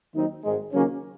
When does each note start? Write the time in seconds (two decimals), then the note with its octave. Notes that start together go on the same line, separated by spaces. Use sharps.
0.15 D#2 D#3 F#3 C4 D#4
0.44 G#1 G#2 D#3 G#3
0.73 D#2 C#3 F#3 A#3 C#4